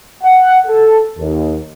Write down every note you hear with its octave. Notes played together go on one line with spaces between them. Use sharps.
F#5
A4
D#2